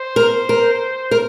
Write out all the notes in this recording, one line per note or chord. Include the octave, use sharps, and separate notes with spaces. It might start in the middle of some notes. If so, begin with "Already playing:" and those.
Already playing: C5
A#4
A#4
A#4